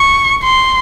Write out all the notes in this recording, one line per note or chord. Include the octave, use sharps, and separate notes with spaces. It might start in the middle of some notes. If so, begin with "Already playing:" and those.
Already playing: C#6
C6